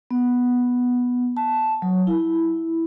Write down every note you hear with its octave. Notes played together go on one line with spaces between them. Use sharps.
B3
A5
F#3
E4